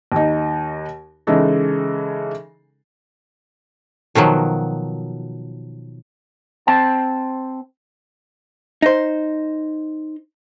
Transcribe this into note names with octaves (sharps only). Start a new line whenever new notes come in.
D#2 D#4
C#3 E3 G#3 D#4 A4
B2 D#3 F3 F#3
C4 C5 G5 A5
D#4 C5